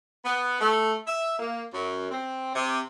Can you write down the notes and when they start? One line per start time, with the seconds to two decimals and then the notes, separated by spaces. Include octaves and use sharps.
0.25 B3
0.60 A3
1.07 E5
1.39 A#3
1.73 F#2
2.10 C4
2.54 C3